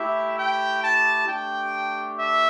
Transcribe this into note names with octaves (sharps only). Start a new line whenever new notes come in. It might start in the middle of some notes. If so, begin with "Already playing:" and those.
Already playing: A3 E4 G4 E5
G5
A5
A3 D4 G4 G5
E5